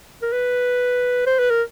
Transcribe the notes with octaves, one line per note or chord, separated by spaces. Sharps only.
A#4
B4
C5
B4
A#4